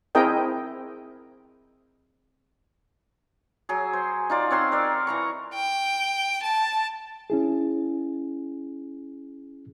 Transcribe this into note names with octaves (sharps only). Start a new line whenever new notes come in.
C4 E4 G#4 A#4 D#5 G5
F#3 G#4
C5
D#4 F4 D5
C4 C#5 F#5 C6
A#4 D5
E3 A#5 C#6
G5
A5
C#4 E4 G#4